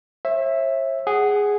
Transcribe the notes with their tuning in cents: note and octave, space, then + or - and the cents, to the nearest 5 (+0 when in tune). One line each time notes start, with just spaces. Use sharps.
C#5 -45 E5 +0
G#4 -5 F#5 +15